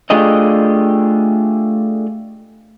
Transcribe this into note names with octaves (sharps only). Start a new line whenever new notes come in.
A3 D4 F4 G4 G#4 D#5